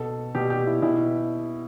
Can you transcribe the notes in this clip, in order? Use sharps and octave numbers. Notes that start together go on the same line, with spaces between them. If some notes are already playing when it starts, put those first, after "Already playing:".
Already playing: B2 A4
B2 G4
G4
E4
B2 E4